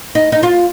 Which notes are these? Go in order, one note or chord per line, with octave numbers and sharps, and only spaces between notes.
D#4
D#4
F4